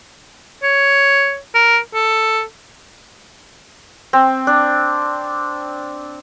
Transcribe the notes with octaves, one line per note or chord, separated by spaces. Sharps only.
C#5
A#4
A4
C4
D4